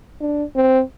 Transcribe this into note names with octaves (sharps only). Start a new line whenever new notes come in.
D4
C4